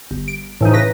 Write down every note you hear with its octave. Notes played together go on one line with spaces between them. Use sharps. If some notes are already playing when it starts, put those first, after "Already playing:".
G1
D7
A2 E3 F3 D#4
C#3 B4 A#6